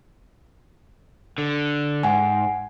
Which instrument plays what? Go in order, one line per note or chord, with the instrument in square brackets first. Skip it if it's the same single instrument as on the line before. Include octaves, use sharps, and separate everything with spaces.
[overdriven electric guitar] D3
[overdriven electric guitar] G#2 [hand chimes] F#5 G#5